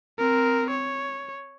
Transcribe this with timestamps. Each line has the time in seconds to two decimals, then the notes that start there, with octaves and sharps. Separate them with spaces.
0.19 C4 A#4
0.70 C#5